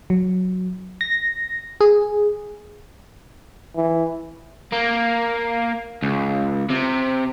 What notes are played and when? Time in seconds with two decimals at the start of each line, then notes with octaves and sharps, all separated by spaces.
0.10 F#3
1.01 A#6
1.81 G#4
3.76 E3
4.72 A#3
6.02 C#2
6.70 C3